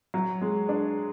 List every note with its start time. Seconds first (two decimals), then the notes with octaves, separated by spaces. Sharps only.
0.14 F#3
0.41 G#3
0.69 D4